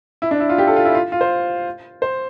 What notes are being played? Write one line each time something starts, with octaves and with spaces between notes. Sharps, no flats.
E4
D4
E4
F4
G4
A4
F4
E4
F4
F4
C5
C5